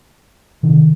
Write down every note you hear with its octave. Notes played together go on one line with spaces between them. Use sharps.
C3 D#3